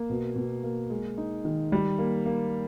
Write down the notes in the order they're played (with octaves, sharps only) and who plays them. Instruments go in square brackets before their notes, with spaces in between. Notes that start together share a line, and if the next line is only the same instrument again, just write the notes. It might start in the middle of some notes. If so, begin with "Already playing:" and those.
Already playing: [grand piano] A#3
B2
B2
A#3
G#3
D#4
D#3
G3
A#3
A#3